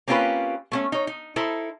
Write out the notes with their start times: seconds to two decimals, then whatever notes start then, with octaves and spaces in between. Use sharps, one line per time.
0.08 A#3 C4 C#4 F4 G4 B4
0.72 A3 A#3 C#4
0.92 D#4 C#5
1.07 D#4
1.36 D#4 E4 A4 C5